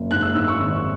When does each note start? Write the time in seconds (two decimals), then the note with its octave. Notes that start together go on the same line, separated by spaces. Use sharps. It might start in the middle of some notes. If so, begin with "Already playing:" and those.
Already playing: F#1
0.11 G#2 F#6
0.22 E6
0.35 G#2 E6
0.48 C#6
0.60 G#1